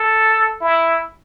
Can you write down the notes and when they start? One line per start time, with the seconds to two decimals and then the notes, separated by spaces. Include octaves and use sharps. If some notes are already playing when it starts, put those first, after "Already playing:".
Already playing: A4
0.61 E4